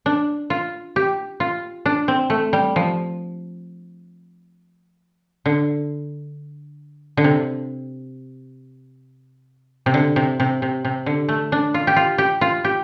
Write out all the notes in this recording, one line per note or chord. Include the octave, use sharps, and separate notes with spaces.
D4
F4
G4
F4
D4
C4
A3
G3
F3
D3
D3
C3
C3
D3
C3
C3
C3
C3
D3
A3
D4
F4
G4
F4
G4
F4
G4